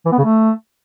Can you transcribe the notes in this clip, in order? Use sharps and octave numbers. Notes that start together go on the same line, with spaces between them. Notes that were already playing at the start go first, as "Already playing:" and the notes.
E3
B3
C#3
A3